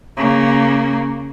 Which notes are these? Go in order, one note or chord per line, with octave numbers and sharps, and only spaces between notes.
C#3 A#3